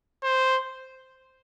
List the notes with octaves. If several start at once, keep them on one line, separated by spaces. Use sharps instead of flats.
C5